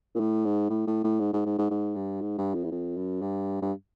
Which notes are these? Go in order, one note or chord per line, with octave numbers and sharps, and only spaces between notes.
A#2
A2
G#2
A2
A2
A2
G#2
G#2
G#2
G#2
G#2
G2
G#2
G2
F2
E2
F2
F#2
G2
G2